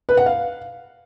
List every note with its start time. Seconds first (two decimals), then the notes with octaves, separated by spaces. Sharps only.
0.09 B4
0.17 F#5
0.26 F5